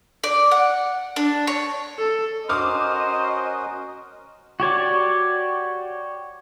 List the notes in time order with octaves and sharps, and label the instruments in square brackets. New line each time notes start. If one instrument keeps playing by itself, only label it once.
[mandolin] D5
F#5
D4
C#5
[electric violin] A4
[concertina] C#4 F#4 A#4 [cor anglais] C5 [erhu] D#5 [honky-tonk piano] D6 D#6 F6
[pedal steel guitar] F#4 G4 C#5 D5